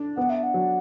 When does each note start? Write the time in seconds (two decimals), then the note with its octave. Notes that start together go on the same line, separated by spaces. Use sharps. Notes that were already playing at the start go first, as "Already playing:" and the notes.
Already playing: D4
0.17 B3 F#5
0.30 E5
0.43 F#5
0.54 F#3